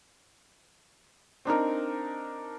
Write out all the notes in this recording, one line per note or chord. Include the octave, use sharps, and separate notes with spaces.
C4 D4 D#4 A#4